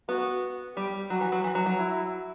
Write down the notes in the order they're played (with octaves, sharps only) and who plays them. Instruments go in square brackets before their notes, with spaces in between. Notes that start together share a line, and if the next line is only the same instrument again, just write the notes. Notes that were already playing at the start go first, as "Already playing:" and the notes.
[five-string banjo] B3 [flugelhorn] F#4
[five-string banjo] G3 [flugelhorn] G4
[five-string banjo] F#3 [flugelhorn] F#4
[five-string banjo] E3
F#3
E3
F#3
F#3
[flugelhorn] E4